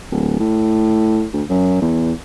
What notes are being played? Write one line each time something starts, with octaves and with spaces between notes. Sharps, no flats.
D1
A2
D2
F#2
E2